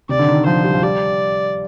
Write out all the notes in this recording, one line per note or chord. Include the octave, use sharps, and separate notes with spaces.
C3 D5
D3
D#3
F3 C5
G3
F3
G3 D5